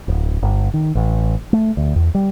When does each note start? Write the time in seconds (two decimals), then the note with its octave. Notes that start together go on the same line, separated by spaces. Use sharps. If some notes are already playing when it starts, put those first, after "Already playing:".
0.08 D1
0.42 G1
0.74 D#3
0.95 A1
1.53 A3
1.77 D2
1.96 E2
2.15 G3